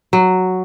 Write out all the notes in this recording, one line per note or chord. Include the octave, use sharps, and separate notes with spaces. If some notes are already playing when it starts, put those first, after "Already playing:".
F#3